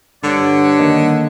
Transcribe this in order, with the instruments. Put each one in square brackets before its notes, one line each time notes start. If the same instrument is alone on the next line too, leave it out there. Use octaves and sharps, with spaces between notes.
[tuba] G2 [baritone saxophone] D3 [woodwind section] C#5 D5 F#5
[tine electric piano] D#3 A#3 D#5